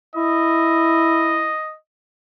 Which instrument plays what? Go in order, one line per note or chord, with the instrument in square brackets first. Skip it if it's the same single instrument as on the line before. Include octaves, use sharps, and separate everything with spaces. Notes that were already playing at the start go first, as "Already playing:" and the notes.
[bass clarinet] E4 [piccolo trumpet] D#5